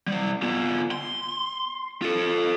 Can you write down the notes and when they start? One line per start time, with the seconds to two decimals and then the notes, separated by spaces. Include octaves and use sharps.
0.08 G3 C5
0.42 B3 F4
0.91 C6
2.02 F4 A4